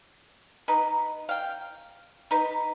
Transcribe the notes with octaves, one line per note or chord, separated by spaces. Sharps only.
D#4 B4
F5 G5
D#4 B4